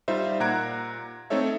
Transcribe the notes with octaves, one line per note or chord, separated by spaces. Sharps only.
G3 D#4 F4 C5 E5
A#2 F#5 A#5 F#6 G#6 D7
A3 C4 D#4 A4 C#5 E5